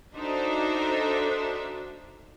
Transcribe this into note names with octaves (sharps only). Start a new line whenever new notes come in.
D4 D#4 F#4 A4 C5 E5